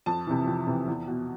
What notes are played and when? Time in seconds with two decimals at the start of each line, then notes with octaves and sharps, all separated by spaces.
0.06 F2 A5
0.27 C3 E3
0.47 F2
0.67 C3 E3
0.88 E2
1.08 B2